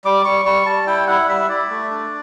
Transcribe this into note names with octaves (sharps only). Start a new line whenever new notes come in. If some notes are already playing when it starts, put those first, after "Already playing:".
G3 D6
G3 C#6
G3 C#6
G3 A5
E4 G5
E4 F#5
G3 E5
E4 D5
A3
D4